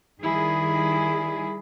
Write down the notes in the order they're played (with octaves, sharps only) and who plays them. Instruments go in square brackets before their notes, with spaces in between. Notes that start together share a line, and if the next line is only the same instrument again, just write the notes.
[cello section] D#3 G3 G#4 [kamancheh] E4